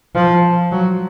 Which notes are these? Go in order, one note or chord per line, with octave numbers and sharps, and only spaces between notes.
F3
F#3